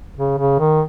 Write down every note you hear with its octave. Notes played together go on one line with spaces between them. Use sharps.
C#3
C#3
D#3